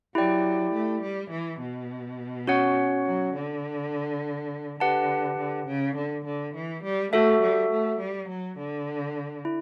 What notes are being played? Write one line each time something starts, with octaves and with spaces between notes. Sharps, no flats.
F#3 E4 G4 D5 G5
A3
G3
E3
B2
C#4 F#4 C#5 F#5
F#3
D3
D3 G4 B4 F#5 A5
D3
C#3
D3
D3
E3
G3
A3 F#4 A4 E5
G3
A3
G3
F#3
D3
E4